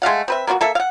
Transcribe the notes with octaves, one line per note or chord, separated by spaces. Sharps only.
G#3 A3 F5 F#5
C4 B4 E5
A#3 B3 F4 F#4
A#3 A4 E5
F5 F#5